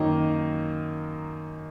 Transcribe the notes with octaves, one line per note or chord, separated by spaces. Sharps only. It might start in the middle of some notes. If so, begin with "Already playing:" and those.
Already playing: F#2 D#3 A#3 D#4 D#5